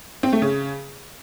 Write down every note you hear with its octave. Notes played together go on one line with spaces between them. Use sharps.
C4
A3
C#3